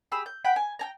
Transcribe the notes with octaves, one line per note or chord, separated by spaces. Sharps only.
G4 G#4 B5 E6
G6
F#5 G5 B5
G#5
G5 G#5 A#5